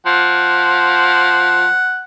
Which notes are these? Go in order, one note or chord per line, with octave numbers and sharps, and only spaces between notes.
F3 F#5